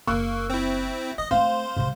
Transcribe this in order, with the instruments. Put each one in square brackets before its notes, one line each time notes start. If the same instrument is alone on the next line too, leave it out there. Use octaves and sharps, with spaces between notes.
[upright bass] F#1 [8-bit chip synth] A#3 [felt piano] C#6 E6 F#6
[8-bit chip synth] C4 E4
[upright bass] F3 [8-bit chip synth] D#5
[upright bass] A3 [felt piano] C4 F5 [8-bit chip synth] C5
[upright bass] C3 G3